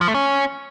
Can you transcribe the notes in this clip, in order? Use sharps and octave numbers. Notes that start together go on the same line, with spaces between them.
F3
A3
C#4